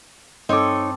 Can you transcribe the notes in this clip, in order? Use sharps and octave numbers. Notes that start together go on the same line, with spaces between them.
G2 C4 D#4 A4 C#5 D6